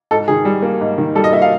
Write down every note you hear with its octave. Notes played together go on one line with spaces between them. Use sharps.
G#2 A4
D#3 G#4
G3
A#3
G#2
D#3
G3 A4
D#5
A#3 E5
F5